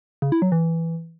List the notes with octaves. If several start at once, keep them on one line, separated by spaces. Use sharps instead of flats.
C#3
E4
F#3
E3